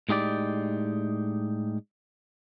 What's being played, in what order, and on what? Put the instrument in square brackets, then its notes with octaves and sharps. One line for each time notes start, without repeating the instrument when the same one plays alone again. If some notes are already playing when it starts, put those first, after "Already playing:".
[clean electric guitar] A2 G#3 D#4 G4 D5